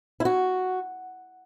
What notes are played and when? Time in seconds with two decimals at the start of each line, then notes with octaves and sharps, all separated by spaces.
0.20 E4
0.25 F#4